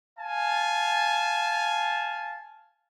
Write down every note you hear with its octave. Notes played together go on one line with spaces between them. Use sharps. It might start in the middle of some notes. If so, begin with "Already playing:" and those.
F5 G#5 A5